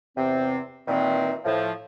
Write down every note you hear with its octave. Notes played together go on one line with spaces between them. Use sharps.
E2 C3 C4
A#2 D#3 E3 C4
A2 F3